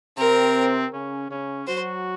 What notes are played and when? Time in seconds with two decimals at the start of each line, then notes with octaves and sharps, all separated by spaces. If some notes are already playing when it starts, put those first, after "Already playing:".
0.17 C3 C4 A#4
0.93 C#3 C#4
1.30 C#3 C#4
1.67 F#3 F#4 C5